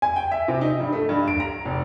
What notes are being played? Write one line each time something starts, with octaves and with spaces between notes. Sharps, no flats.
G#5
G5
E5
C3
D#4
G2
A3
G2
D7
A#5
F1